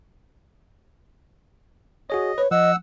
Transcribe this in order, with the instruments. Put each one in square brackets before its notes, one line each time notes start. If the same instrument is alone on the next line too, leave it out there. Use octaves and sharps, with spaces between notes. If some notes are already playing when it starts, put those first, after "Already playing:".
[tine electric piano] F#4 G#4 C#5 [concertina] D#5
[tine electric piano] B4 [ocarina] C#5
[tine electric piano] F3 [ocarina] D#5 [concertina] F#5 E6